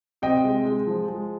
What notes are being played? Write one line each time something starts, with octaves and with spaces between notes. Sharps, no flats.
C3 D#5 G5
G#3
G#3
F3
G#3